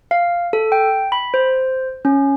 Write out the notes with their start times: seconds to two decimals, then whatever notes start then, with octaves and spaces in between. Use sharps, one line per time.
0.11 F5
0.53 A4
0.72 G5
1.12 B5
1.34 C5
2.05 C#4